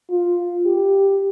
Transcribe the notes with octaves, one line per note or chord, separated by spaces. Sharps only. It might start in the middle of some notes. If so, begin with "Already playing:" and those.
F4
G4